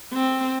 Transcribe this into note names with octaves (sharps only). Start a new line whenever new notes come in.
C4